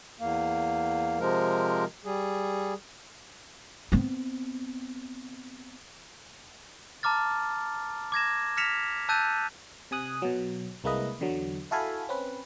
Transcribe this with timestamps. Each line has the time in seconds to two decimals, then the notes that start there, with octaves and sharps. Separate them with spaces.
0.20 E2 A#3
1.19 C3 F3 G#3 A#4
2.05 G3 G#4
3.92 B3 C4
7.03 A5 A#5 D6 F6 A6
8.12 D6 G#6 A#6 E7
8.57 F6 A#6 B6 C#7 E7 F7
9.09 A5 E6 F#6 G6 A6 D#7
9.91 C3 G#5 D#6 F#6
10.22 B2 F#3
10.84 C2 G#3 A#3 E4 B4 D#5
11.20 E2 D3 F#3
11.71 E4 F#4 A4 F5 G#5 B5
12.09 C4 C#4 B4